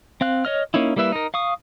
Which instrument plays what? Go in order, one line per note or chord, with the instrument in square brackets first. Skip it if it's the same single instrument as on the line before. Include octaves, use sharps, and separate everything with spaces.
[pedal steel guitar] C4 F5 F#6
C#5 D#5 F6
A#3 C#4 D#4 E4
G3 A#3 E4 B4 E5
D#4 A#4
F5 C#6 D#6